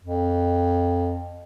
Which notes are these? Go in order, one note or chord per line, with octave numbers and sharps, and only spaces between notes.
F2